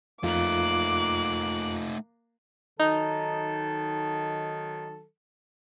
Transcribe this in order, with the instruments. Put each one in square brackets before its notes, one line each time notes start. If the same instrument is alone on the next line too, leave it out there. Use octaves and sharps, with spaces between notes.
[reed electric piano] F2 F4 [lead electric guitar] A3 D#4 [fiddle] A#3 F#6 [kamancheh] D6
[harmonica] D#3 F#3 A4 [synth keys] D#4